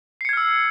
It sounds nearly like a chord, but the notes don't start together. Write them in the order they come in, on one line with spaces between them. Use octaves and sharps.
C7 C#7 G#6 F6 E6